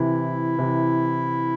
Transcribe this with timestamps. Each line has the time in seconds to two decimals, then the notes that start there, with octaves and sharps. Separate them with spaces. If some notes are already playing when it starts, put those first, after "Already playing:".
Already playing: C3 E3 E4
0.59 C3 E3